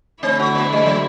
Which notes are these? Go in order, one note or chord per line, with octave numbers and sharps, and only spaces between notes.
D3 A3 C4 E4
F#4
B3
G3
F#3